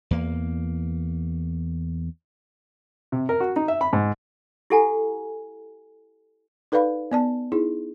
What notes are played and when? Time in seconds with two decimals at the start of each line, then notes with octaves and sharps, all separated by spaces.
0.11 E2 A#3
3.12 C3
3.29 A#4
3.40 F#4
3.56 D#4
3.68 E5
3.81 B5
3.93 G#2
4.70 E4 G4 A4 F#5 G#5 A#5
6.72 D#4 A4 B4 D5 F5 B5
7.12 B3 D5 A5
7.52 D#4 E4 G#4